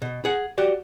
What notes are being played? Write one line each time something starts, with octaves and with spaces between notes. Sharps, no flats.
B2
G#4 F#5
F#4 G4 D5